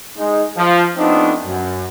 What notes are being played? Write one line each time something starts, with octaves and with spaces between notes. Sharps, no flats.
G#3 D#4
F3
F3 A3 B3 C4 D4 D#4
F#2